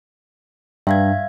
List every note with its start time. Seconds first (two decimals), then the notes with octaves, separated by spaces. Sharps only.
0.87 G2 E5 F5 G#6